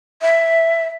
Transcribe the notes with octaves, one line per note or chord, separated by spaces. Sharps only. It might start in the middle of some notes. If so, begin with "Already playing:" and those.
E5